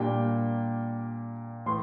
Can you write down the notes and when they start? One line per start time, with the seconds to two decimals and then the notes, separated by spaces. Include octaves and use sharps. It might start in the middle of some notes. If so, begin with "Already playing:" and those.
Already playing: A#2 G3 A#3 D4 G5
1.66 A2 E3 C6